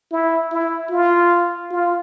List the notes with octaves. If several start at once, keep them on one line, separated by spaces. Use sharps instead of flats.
E4
E4
F4
F4